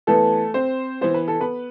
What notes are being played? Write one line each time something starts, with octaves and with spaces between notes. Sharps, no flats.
E3 A3 B3 A4
C4 C5
E3 B3 C5
B4
A4
B3 B4